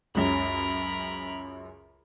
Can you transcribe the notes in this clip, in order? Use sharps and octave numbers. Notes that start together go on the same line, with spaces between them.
C#2 F#2 C#4 A#4 B5